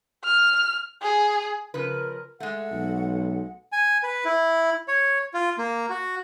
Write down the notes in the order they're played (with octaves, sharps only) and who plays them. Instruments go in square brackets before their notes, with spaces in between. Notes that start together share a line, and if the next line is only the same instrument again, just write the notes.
[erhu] F6
G#4
[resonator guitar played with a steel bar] C#3 F3 B4 [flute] A#4
[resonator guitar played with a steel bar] G#3 A3 [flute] F#5
[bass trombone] B1
[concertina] G#5
B4
E4
C#5
F4
A#3
F#4